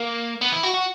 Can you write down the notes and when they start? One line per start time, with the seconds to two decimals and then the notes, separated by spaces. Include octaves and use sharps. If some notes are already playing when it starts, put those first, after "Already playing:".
Already playing: A#3
0.41 B3
0.52 E4
0.63 F#4
0.74 F#4